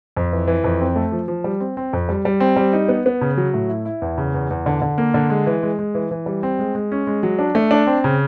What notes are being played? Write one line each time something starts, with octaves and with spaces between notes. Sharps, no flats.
F2
E3
E3
F2
C4
A3
F3
F3
G3
C4
C4
F2
G3
G3
C4
G3
D#4
B3
B3
C#3
F#3
A2
E4
E4
E2
C#3
E2
E2
D3
D3
A#3
D3
G#3
E3
G#3
G#3
E3
E3
G3
C4
G#3
G#3
C#4
G#3
F#3
D4
A3
D4
C4
C#3